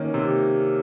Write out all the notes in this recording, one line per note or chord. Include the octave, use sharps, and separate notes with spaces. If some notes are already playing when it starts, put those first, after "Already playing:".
Already playing: D#3 A#3 C#4
C3